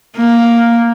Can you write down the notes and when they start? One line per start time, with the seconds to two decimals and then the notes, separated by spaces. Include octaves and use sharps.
0.16 A#3